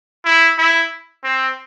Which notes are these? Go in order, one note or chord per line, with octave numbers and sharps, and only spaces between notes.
E4
E4
C4